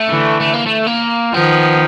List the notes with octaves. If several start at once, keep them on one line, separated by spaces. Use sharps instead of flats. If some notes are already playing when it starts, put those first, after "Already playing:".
Already playing: A3
D3 E3
A3
A#3
A3
A#3
D#3 F3 B3